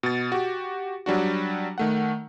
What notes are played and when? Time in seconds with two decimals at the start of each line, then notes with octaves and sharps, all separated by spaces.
0.03 B2 A6
0.32 F#4 G4
1.06 F#3 G3 D4 F#4
1.78 D#3 A3 F#5